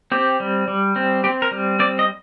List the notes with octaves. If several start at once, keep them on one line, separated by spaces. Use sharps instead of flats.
C4 G4
G3
G3
C4
C4 G4
A#4
G3
C4 D5
D#5